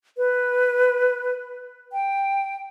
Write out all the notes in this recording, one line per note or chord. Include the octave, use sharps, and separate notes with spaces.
B4
G5